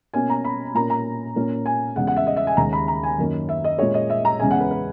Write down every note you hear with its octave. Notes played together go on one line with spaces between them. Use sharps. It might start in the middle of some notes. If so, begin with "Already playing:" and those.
B2 A#3 C#4 G#5
A#5
B5
A#2 A#3 C#4 A#5
A#5
A#2 A#3 C#4
G#5
E2 C#3 G#3 F#5
F#5
E5
D#5
E5
G#5
D#2 C#3 G#3 A#5
B5
A#5
G#5
F#2 D#3 A#3 C#4
E5
D#5
A#2 G#3 C#4 C#5
D#5
E5
A#5
E2 C#3 G#3 C#4 G#5
F#5
B4
B4